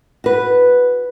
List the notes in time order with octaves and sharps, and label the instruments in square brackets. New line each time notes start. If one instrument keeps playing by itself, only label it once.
[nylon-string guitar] F#4 B4